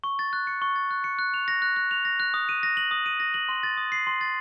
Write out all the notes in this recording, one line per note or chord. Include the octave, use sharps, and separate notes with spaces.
C#6
A6
F#6
C#7
C#6
A6
F#6
C#7
F#6
F7
A#6
F#6
F#6
F7
A#6
F#6
D#6
D#7
A#6
F#7
D#6
D#7
A#6
F#7
C6
A6
D#6
C7
C6
A6